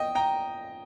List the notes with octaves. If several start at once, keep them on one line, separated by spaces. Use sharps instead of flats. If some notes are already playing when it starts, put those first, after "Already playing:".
Already playing: D#5 G5
G5 A#5